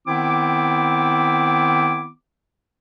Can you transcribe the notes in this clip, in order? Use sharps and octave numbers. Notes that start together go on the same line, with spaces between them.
D#3 B3 C4 E4 D6